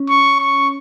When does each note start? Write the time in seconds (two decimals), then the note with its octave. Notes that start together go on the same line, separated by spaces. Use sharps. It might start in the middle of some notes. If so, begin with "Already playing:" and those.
Already playing: C#4
0.09 C#6
0.40 C#6